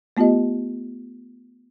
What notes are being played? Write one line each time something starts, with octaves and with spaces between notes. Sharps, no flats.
A3 B3 F4 G4 D#5